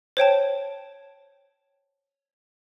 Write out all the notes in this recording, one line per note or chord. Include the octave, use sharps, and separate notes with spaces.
C5 C#5 G5 A5